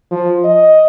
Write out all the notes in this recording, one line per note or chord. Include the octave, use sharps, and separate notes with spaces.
F3
D#5